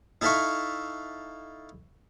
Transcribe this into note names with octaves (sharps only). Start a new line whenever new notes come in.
D#4 E4 A4 E5 F5 C#6